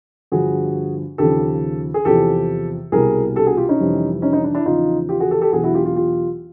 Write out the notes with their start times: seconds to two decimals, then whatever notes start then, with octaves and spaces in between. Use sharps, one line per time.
0.32 G2 D3 F3 F#4 G#4
1.18 D#2 C#3 F3 G4 A4
1.94 G#4
2.05 E2 C3 F3 G4 A4
2.92 C2 B2 G3 G#4 A#4
3.36 G4 A4
3.46 F#4 G#4
3.57 F4 G4
3.69 C#4 D#4
3.80 F2 C3 E3 G3
4.22 C#4 D#4
4.33 C#4 D#4
4.44 D4
4.55 D4 E4
4.66 E2 C#3 F3 D#4 F4
5.09 F4 G4
5.20 F#4 G#4
5.31 G4 A4
5.41 G4 A4
5.52 E2 B2 F#3 F#4 G#4
5.64 E4 F#4
5.74 F4 G4
5.85 F4 G4
5.96 F4 G4